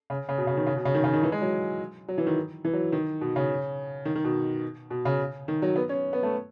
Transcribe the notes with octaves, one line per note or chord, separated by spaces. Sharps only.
C#3
C#3
B2
C#3
D#3
C#3
B2
C#3
D#3
C#3
D#3
E3
G#3
F#3
F#3
E3
D#3
E3
F#3
D#3
B2
C#3
D#3
D#3
B2
B2
C#3
D#3
F#3
B3
C#4
B3
A3